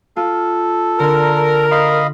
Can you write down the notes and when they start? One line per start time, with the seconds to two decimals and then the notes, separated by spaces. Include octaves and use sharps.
0.16 F4 A4
0.99 D3 A#4
1.71 D#5 F5 B5 C6